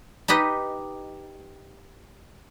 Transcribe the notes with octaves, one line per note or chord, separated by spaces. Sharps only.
D#4 G4 B4 D#5